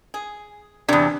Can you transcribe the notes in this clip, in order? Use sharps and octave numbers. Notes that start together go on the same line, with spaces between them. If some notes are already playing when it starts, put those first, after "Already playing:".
G#4
E2 C3 D4 D5